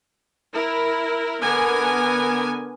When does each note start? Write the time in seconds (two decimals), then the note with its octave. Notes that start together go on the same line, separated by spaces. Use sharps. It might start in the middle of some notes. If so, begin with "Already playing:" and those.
0.52 E4 A#4
1.41 D3 B3 A#4 G#5